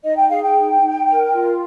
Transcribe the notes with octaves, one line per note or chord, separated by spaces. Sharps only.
D#4 D#5
G5
G#4 F5
G5
D#4
D#4
A#4
F4